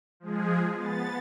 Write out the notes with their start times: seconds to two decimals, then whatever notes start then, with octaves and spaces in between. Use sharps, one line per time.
0.20 F3 G#3 G#4
0.74 B3 A6